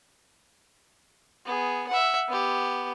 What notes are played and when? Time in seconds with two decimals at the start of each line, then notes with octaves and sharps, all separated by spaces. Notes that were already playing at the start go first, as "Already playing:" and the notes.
1.45 B3 G#4
1.89 E5 F#5
2.28 B3 G4